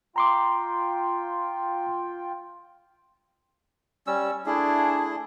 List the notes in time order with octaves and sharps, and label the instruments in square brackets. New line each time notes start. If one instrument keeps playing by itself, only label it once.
[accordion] F4 G5 [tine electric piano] A#5 C6 D6
[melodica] G3 C#4 E6
[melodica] A3 E4 G#4 [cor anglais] D4